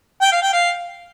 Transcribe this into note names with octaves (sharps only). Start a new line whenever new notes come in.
G5
F5
G5
F5